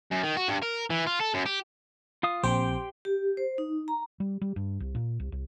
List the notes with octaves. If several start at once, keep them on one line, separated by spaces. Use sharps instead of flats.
F#2
D#3
F#4
G2
A#4
E3
F4
A4
F#2
G4
F4 F5 D#6
A#1 C4 G4 C5 G5 C6
G4
C5
D#4
A#5
G3
G3
G2
C2
A#2
C2
C2